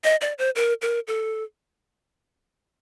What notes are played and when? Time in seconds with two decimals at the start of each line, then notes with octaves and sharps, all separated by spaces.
0.04 D#5
0.21 D5
0.38 C5
0.55 A#4
0.82 A#4
1.08 A4